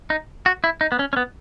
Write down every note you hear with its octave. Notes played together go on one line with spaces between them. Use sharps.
D#4
F#4
E4
D#4
B3
C#4
C#4
B3